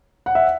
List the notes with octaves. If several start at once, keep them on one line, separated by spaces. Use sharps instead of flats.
F#5
E5